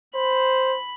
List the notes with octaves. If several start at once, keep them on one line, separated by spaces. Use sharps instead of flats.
C5 B5